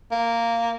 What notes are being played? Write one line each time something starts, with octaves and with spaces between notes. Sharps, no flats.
A#3